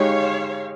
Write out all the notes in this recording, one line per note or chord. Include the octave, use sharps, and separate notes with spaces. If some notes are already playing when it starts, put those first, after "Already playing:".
Already playing: G#3 D#4 G4 C#5 F5